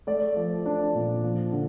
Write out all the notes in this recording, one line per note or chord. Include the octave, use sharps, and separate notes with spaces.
A3 D5
F3
D4
A#2
F3
D3